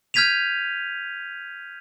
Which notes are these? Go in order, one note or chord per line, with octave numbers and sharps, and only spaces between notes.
F6 G6 G#6 B6 D#7 F7